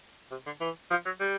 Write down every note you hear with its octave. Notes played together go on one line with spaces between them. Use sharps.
C3
D3
E3
F3
F#3
G3